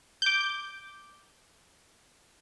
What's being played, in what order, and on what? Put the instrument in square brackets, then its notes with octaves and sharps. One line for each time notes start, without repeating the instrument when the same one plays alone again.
[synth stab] D6 G6